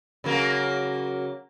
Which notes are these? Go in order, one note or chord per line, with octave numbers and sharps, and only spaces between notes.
C#3 F#3 A#3